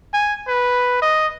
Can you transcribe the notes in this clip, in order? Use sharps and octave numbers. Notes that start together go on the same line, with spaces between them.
G#5
B4
D#5